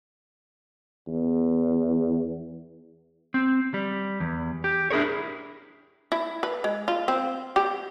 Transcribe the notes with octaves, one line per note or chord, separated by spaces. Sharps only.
E2
C4
G3
E2
G4
D4 E4 G#4 A#4 C#5
E4
B4
G#3
F4
C4
G4